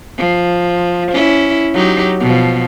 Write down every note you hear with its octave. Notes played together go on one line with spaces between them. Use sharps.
F3
C#4 E4
F#3 D#4 G4
B2 F3